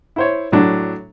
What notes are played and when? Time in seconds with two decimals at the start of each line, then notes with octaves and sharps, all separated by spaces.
0.16 E4 C5 C#5
0.52 A2 F#3 D4